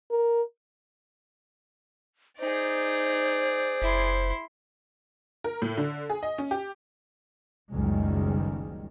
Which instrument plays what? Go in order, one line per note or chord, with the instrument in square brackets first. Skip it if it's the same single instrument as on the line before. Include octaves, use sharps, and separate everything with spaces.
[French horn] A#4
[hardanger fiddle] D#4 [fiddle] G#4 D5 [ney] C5
[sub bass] F#1 [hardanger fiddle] E4 C6
[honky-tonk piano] A#4
A2
D3
G#4
D#5
C#4
G4
[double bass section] F#1 C#2 F#2 D#3 G3 G#3